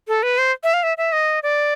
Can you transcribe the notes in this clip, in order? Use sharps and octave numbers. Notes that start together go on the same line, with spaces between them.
A4
B4
C5
E5
F5
E5
E5
D#5
D5